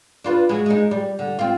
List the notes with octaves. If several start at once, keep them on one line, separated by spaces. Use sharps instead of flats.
D4 F4 B4
F#3 G#3
G#3 D#4
G3
D3
C4 F4